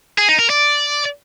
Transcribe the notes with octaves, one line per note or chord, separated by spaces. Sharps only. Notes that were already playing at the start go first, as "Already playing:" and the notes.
G#4
D#4
A#4
D5